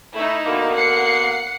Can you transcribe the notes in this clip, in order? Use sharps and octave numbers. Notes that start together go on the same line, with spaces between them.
A3 D#4 E4
B2 D3 A#3
F#5 C7 C#7